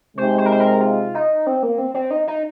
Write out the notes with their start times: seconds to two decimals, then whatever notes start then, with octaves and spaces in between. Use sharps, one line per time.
0.17 C3 G#3 D#4 C5
0.38 C5
0.46 A#4
0.52 C5
0.60 A#4
0.81 F4
1.15 D#4
1.47 C4
1.63 A#3
1.78 C4
1.94 C4
2.11 D#4
2.27 D#4